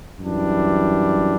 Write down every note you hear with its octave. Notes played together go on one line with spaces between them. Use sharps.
F#2 E3 G3 D4